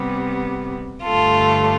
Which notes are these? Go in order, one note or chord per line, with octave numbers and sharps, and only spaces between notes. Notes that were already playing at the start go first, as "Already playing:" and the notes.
Already playing: C3 G3 B3
G2 D3 A3 F4 A4